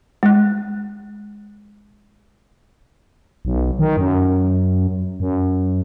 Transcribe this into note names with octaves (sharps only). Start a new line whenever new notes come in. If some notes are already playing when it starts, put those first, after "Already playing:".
G#3 F#6
B1
D#3
F#2
F#2